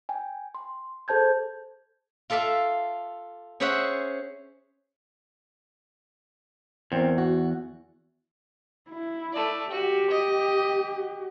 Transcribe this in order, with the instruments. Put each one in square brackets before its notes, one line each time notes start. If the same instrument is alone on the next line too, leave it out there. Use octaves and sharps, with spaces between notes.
[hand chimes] G5 G#5
C6
G#4 A4 C5 A5 G6 G#6
[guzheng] F4 A4 D5 E5 F5
C#4 G#4 C5 C#5 E5 F#5
[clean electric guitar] E2 [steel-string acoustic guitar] C4 A#4
[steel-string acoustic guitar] F#4
[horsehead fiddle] E4
[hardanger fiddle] A3 D5
[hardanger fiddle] F#4 [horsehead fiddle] G4
[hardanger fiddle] D#5